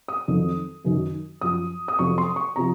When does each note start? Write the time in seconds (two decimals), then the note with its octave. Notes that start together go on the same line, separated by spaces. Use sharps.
0.08 D#6
0.28 F2 D#3 F#3
0.84 F#2 D#3 F#3
1.41 F#2 F3 D#6
1.88 D#6
1.99 F2 C3 F#3 C#6
2.18 C6
2.36 C#6
2.56 C3 F3 A#5